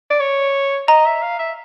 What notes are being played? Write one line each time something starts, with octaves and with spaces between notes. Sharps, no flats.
D5
C#5
D#5 A#5
E5
F5
E5